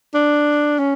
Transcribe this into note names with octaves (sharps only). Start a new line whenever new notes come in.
D4
C#4